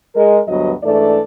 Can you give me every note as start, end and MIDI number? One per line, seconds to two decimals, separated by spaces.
0.14 0.38 56
0.14 0.38 70
0.47 0.72 38
0.47 0.72 43
0.47 0.72 54
0.47 0.72 55
0.47 0.72 59
0.47 0.72 75
0.83 1.20 44
0.83 1.20 52
0.83 1.20 57
0.83 1.20 62
0.83 1.20 69
0.83 1.20 74